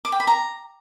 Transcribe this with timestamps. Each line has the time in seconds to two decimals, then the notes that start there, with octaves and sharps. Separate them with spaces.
0.05 D6
0.12 G5
0.20 B5
0.27 A#5